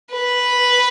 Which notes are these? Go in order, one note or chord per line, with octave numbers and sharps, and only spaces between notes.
B4